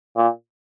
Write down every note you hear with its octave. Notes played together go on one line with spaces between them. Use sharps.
A#2